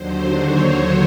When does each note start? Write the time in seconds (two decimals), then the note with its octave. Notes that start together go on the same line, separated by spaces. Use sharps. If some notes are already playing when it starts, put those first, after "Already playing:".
Already playing: D#2 D3 F#3 C5
0.36 C#5